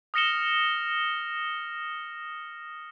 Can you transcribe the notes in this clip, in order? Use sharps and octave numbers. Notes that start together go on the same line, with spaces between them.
D#6 F6 A#6 C#7 E7 G7